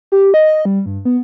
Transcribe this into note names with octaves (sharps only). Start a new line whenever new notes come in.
G4
D#5
G3
G2
B3